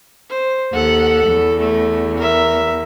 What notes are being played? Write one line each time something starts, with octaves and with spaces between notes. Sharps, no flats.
C5
D#2 A4 F#5
E2
A3
A#4 E5